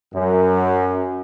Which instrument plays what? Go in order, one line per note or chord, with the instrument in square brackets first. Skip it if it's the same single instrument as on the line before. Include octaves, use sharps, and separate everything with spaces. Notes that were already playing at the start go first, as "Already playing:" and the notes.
[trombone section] F#2